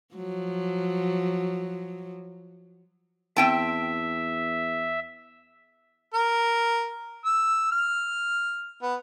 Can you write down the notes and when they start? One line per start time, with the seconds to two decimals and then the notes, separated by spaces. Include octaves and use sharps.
0.15 F3 F#3
3.37 E2 C4 E5 G5 A5
6.14 A#4
7.25 E6
7.72 F6
8.82 B3